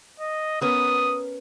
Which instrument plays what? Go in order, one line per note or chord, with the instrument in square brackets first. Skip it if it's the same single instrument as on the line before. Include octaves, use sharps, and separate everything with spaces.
[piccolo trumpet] D#5
[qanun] B3 C#4 A#4 [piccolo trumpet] D#6